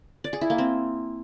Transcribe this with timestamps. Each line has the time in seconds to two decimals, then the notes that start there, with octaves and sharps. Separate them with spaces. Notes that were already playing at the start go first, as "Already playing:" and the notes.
0.24 D5
0.33 G#4
0.41 E4
0.50 A#3
0.58 C4